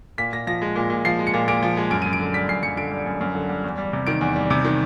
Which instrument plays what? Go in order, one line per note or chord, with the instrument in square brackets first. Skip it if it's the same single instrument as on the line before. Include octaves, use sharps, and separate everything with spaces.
[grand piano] A#2 B6
A#2 A#6
F3 A#6
G#3
A#2
A#2
F3 C7
G#3
C#7
A#2
A#2 D7
F3
G#3
F#2 D7
D#7
F#2
D7
D3
G3 B6
F#2 C7
F#2 C#7
D3 D7
G3
F#2
F#2
D3
G3
E2
G3
C3
D#3 D7
E2
G3
C3
D#3